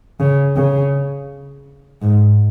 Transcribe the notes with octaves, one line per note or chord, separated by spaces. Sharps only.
C#3
C#3
G#2